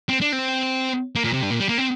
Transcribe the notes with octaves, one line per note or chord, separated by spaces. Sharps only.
C4
D4
C4
A#3
A#2
C3
G2
A#2
G3
A#3
C4